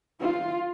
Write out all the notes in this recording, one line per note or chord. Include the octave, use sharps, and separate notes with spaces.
F4